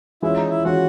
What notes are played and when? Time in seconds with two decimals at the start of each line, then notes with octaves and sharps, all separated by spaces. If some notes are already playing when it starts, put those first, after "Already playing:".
0.22 E3 G#3 C#4 E4 F4
0.36 D#4
0.49 E4
0.64 E3 G#3 C#4 F4 F#4